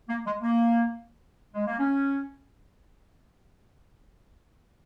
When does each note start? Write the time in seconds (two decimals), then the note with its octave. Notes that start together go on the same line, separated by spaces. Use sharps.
0.09 A#3
0.26 G#3
0.42 A#3
1.54 G#3
1.67 A#3
1.79 C#4